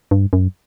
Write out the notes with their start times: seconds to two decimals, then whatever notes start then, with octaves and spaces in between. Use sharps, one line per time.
0.11 G2
0.33 F#2